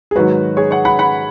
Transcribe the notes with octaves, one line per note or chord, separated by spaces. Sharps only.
G#4
G#2 D#3 F#3 F#4 B4
G#4 C#5
C#5 F#5
F#5 B5
F#5 B5